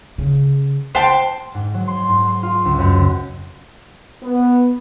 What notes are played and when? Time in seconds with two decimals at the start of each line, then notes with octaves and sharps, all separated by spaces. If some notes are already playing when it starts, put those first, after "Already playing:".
0.18 C#3
0.95 E4 C5 G5 A5
1.55 G#2
1.74 F#3
1.87 C6
2.09 G#2
2.28 C6
2.43 F4
2.65 C#2
2.79 F#2
2.95 C#2
4.22 B3